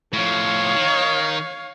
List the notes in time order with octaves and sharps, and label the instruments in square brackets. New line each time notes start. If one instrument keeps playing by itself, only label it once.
[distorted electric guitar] A2 F3 [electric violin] C#5 F5
[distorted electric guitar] D#3